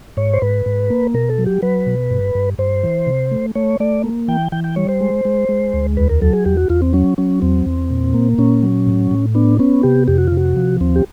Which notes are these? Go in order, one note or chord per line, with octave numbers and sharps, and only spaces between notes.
G#2 C#5
C5
G#2 B4
G#2
A#3
B2 A#4
A4
F#3
G4
F#3 B4
B2
G2
G2
G2 C5
E3
C3
A3
A3 C#5
A3 D5
A#3
E3 G5
E3 G5
G5
G3 C#5
C5
G#3
G#3
G#3
D2
E2 B4
A#4
F#3 A4
G#4
E2 G4
F#4
E2 F4
C4
F#3 C#4
F#3 C#4
E2 C4
E2
A#2
A#3
A#2 C#4
F#3
A2
A2
B3 D4
B3 C#4
C3 G4
F2 G4
F#4
C3 F4
F#4
F3
D#2 C4
G4